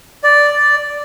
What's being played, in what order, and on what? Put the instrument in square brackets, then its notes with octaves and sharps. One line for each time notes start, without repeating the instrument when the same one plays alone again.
[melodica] D5